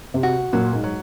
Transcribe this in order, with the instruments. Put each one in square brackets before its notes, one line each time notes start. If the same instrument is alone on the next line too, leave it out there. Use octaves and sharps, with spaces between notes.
[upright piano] C3
[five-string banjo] F#4
[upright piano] A#2 [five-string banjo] F#3
[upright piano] G#2
[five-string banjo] F#3